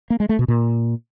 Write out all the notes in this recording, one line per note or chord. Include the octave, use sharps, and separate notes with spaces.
A#3
G#3
A3
B2
A#2